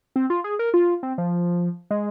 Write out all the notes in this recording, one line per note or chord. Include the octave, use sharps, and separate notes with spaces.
C4
F4
G#4
A#4
F4
C4
F3
G#3